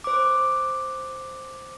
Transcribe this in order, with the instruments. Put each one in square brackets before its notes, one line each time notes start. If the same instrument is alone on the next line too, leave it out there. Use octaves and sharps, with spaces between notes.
[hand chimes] C5 D6